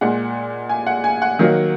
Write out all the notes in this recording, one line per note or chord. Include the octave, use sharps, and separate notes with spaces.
A#2 G#3 F#5
G#5
F#5
G#5
F#5
D#3 F#3 A#3